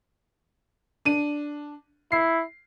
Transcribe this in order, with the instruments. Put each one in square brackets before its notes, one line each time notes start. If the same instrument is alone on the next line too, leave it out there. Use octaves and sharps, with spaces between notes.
[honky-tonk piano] D4 D#7
[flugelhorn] E4 [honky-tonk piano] C7